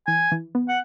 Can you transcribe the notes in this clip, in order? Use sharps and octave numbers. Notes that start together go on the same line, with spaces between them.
E3 G#5
E3
B3
F#5